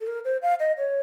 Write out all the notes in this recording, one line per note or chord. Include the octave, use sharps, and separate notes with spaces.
A4
A#4
C5
F5
D#5
C#5